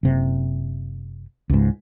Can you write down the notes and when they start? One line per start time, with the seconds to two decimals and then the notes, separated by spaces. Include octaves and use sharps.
0.03 F#1 C3
1.50 C#2 G#2